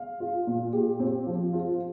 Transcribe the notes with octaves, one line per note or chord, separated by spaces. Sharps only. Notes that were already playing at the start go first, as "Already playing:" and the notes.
Already playing: F5
F4
A#2
G4
C4
F3
F4